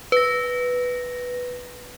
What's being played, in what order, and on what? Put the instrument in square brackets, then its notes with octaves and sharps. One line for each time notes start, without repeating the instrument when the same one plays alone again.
[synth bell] B4 A#6